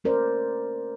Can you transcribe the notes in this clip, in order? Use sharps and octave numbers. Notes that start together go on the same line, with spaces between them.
A3 C#4 A#4 C5 D5